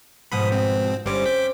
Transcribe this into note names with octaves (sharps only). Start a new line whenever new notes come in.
G#2 B2 F3 B5 D#6
C4
G1 G3 C4 C#4 D6
D6 G6 B6